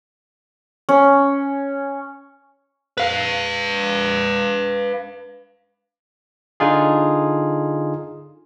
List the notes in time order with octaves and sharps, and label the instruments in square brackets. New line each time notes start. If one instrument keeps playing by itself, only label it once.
[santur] C#4
[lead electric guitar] B4 F5
[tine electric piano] D3 D#4 F4 G#4